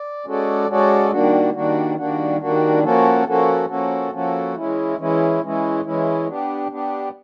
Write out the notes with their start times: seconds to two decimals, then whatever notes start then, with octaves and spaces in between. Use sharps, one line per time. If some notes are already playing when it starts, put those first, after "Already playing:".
Already playing: D5
0.26 G#3 C#4 F#4 A4 D5
0.69 G#3 C#4 F#4 A4 D5
1.11 D#3 G3 A#3 D4 F#4
1.54 D#3 G3 A#3 D4 F#4
1.97 D#3 G3 A#3 D4 F#4
2.41 D#3 G3 A#3 D4 F#4
2.83 F3 A#3 C#4 F#4 A4
3.26 F3 A#3 C#4 F#4 A4
3.69 F3 A#3 C#4 F#4 A4
4.12 F3 A#3 C#4 F#4 A4
4.56 E3 G#3 C#4 E4
4.98 E3 G#3 C#4 E4
5.41 E3 G#3 C#4 E4
5.84 E3 G#3 C#4 E4
6.28 B3 D4 G4
6.70 B3 D4 G4